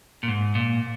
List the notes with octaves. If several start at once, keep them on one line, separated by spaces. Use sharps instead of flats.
A#2
G#2
A#2